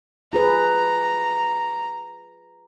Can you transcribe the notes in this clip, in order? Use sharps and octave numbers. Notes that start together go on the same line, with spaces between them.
F4 G#4 B4 A#5